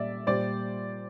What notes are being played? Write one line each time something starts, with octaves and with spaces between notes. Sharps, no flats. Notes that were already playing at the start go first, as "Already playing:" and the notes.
Already playing: A#2 G3 D5 E5
A#2 G3 C5 D5